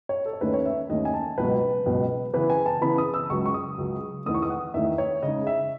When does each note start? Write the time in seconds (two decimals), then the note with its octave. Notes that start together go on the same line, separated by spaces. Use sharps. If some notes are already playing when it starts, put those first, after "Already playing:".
0.09 C#5
0.26 A4
0.33 C#5
0.41 D#2 D#3 A3 C#4 B4
0.54 C#5
0.66 E5
0.89 D#2 D#3 A3 C#4 D#5
1.05 G#5
1.14 A5
1.38 C#2 B2 F#3 B4
1.86 C#2 B2 F#3
2.34 C#3 E3 B3 E4 B4
2.50 G#5
2.66 A5
2.81 C#3 E3 B3 E4 B5
2.98 D#6
3.14 E6
3.30 C#2 C#3 F#3 C#6
3.46 C#6
3.54 D#6
3.78 C#2 C#3 F#3
4.26 E2 D#3 A3 D#6
4.34 C#6
4.42 D#6
4.50 F#5
4.74 E2 D#3 A3 E5
4.98 C#5
5.23 C#3 G#3 D#4 D#5
5.47 E5